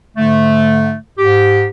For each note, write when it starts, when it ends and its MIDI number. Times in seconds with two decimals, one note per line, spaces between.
0.16 0.95 44
0.16 0.95 50
0.16 0.95 57
1.17 1.65 44
1.17 1.65 67